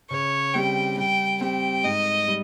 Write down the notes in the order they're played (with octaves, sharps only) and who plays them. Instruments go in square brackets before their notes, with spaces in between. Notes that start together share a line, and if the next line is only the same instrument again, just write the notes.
[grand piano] C#3 [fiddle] C#5
[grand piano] G3 C4 G4 [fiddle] G5
[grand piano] G3 [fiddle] G5
[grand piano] C4 G4 [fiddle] G5
[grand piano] G#2 [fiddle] D#5
[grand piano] G3